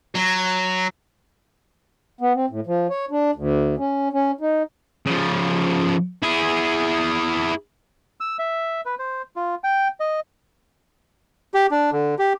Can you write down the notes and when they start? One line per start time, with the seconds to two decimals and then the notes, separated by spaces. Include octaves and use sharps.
0.15 F#3
2.21 B3
2.35 C4
2.50 A2
2.67 F3
2.90 C#5
3.11 D4
3.35 D2
3.78 C#4
4.13 C#4
4.41 D#4
5.06 C#3 F3
6.22 E4 G#4
8.20 E6
8.39 E5
8.86 B4
8.99 C5
9.36 F4
9.64 G5
10.00 D#5
11.54 G4
11.71 D4
11.92 D3
12.19 G4